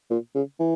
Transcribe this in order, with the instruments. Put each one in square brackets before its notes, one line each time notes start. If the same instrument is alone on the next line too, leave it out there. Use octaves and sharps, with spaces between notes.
[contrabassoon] A#2
C#3
E3